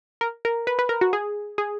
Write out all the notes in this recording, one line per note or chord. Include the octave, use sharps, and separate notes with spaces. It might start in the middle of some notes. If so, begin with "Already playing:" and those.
A#4
A#4
B4
B4
A#4
F#4
G#4
G#4